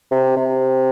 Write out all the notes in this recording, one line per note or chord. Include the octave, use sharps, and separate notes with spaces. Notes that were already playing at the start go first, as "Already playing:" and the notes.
C3
C3